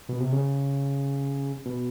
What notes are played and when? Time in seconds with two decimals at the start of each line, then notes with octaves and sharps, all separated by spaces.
0.09 B2
0.20 C3
0.32 C#3
1.66 B2